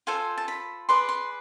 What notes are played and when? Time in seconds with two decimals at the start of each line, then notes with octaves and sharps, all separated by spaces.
0.07 F4 A4 C5 G#5
0.38 A5
0.48 B5
0.89 G#4 B4 D5 C6
1.09 C6